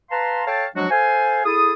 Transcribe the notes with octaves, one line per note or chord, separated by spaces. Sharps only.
B4 F5 A5 A#5 C6
A4 C#5 F5 G5 A5
F3 F#3 G#3 D4 F#4
A4 C5 F5 G#5
E4 G#4 A4 D#6